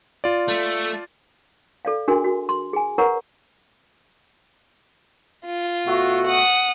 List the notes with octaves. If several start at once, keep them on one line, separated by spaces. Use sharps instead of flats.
F4 D5
A3
A4 D5 F5
D4 F#4 G#4 A#4 G#5 C6
F#4
C6
G#4 G#5
A#4 B4 C#5 F#5 A#5 C#6
F4
B2 A3 F#4
F#5 D#6